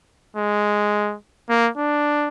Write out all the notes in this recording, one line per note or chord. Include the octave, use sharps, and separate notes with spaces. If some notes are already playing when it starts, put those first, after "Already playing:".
G#3
A#3
D4